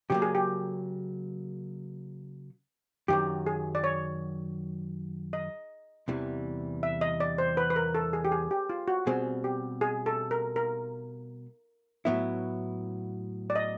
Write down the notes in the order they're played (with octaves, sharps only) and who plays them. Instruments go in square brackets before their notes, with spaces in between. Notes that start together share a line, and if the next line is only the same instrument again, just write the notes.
[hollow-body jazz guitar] C#3 F#3 A#3 [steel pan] G4
[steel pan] G#4
G4
[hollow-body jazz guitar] F#2 D#3 F#3 [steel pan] G4
[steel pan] G#4
D5
C#5
D#5
[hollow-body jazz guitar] E2 C3 E3 G3
[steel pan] E5
D#5
D5
C5
B4
B4
A#4
A4
G#4
G4
G#4
G4
F4
F#4
[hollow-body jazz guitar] B2 G3 C4 [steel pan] G#4
[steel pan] G4
G#4
A4
A#4
A#4
[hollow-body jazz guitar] A2 F#3 B3 E4 [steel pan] E5
[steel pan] D5
D#5